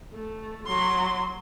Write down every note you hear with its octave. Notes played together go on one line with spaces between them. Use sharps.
A3
F#3 C6